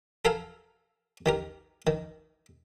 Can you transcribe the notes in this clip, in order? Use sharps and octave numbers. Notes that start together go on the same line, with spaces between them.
A4 A#4 F5 G#5
D#3 G4 A#4
D#3